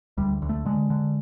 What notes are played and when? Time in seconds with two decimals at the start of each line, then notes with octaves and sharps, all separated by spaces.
0.17 D2 G3
0.42 D2
0.49 A3
0.66 D3 G#3
0.90 D3